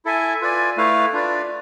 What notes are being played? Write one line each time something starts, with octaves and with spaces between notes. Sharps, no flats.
E4 A4 E5 G#5
F4 B4 D5 G#5
A3 E4 B4 F5
D4 F4 B4 D5